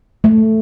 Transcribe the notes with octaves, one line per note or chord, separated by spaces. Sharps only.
A3